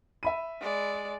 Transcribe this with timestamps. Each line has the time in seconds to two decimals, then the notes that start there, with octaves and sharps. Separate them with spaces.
0.23 E5 B5 D#7
0.61 G#3 D5